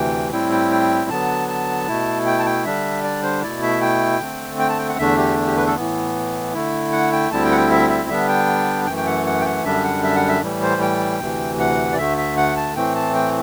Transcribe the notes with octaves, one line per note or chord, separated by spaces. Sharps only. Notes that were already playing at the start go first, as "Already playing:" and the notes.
Already playing: D2 C3 E3 G5
A2 G3 C4 E4 G5
G5
G5
D3 F#3 B3 A5
A5
B2 A3 E4
G5
A5
G5
D3 G3 D4 E5
D5
C5
B2 A3 E4 D5
E5
G5
D3 A3 C4
G5
A5
G5
F#5
E2 D3 A3 D4 E5
G4
G4
B4
A4
A2 E3 B3
D3 A3 E4
F#5
G5
D2 D3 G3 C4 E4 A5
G5
F#5
G5
E5
E5
D3 G3 B3 D4 E5
G5
F#2 E3 A3 G5
G5
F#5
F#5
G5
F#5
F#2 D3 G3 D4 E5
F#5
E5
F#5
E5
A2 E3 G3
C5
G5
D2 C3 E3
F#5
D5
D2 D3 A3 E5
E5
F#5
A5
A2 E3 A3 C4 G5
A5
G5